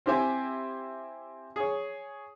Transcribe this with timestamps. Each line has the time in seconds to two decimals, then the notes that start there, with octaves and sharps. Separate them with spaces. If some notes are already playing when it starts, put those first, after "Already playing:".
0.06 C4 E4 G4 C5 E5 G#5
1.56 G#4 C#5